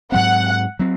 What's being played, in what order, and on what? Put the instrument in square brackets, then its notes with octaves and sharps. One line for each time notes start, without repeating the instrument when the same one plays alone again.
[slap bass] G#2 F#3 C4 [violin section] F#5
[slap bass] F#3 C4